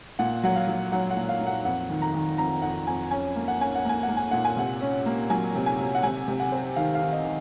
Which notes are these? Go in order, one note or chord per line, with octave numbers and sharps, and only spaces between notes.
A#2 F#5
F#3 F#5
F5
F#3
F#3 F#5
F#5
A#2
F5
A#2
F#5
F2 F#5
D#3
A#5
D#3
F2 A#5
F2 F#5
F2 G#5
C#4 G#5
A#3
F#5
C#4 G#5
F#5
A#3 G#5
F#5
A#3
G#5
A#2 F#5
G#5
C3 F#5
C#4
A#3
F#3 G#5
C3
G#5
C3
F#5
C3 G#5
C3
F#5
C4
D#3 F5
F5
D#3
D#5
D#3